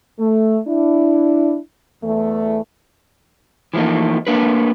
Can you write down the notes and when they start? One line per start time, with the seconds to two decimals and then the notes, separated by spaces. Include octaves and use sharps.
0.19 A3
0.67 D4 E4
2.03 E2 E3 A3
3.74 E3 F3 A3 A#3 D#4
4.27 A3 A#3 D4 A#4 B4